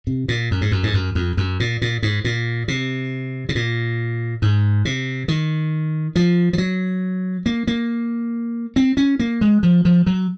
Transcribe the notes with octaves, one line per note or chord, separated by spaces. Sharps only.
C3
A#2
F#2
G#2
F#2
G#2
F#2
F2
F#2
A#2
A#2
G#2
A#2
C3
C3
A#2
G#2
C3
D#3
F3
F3
F#3
A#3
A#3
C4
C#4
A#3
G#3
F3
F3
F#3